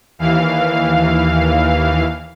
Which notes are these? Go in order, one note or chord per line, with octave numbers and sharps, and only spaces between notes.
D#2 E3 F5